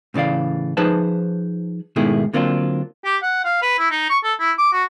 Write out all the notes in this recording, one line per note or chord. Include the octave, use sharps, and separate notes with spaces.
A2 C#3 E3 D5 F5
F3 D#4 G#4 B4 C5 A5
G#2 B2 D#3 A3 E4 G#4
D3 F#3 A#3 C4 D4 F4
G4
F#5
F5
B4
E4
D#4
C#6
A4
E4
D6
F#4